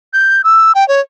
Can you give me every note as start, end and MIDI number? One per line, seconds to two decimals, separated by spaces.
0.13 0.42 91
0.44 0.72 88
0.75 0.87 79
0.88 1.00 73